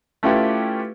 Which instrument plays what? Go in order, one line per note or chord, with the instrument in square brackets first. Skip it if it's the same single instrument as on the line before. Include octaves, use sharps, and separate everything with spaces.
[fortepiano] A3 C#4 E4 F4 G4 B4